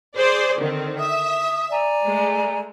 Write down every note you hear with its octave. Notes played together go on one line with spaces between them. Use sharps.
G#4 C5 D5
D3 D#3 C4
E5 D#6
D5 G#5 A#5
G#3 A3